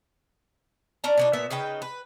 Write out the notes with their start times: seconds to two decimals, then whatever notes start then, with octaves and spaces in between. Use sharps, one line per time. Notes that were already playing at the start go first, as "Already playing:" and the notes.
1.04 C#4 D4 A#5
1.18 B2 D4 D#4
1.33 A#2 B3 E5
1.51 C#3 D#4 B4 G5
1.82 B4